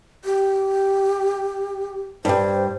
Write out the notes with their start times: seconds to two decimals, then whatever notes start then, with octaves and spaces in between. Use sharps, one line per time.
0.25 G4
2.25 G2 G3 C5